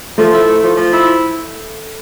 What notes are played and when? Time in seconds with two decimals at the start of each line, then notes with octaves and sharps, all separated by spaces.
0.18 F3 A3
0.33 E4
0.48 A3
0.63 F3
0.77 F3
0.92 E4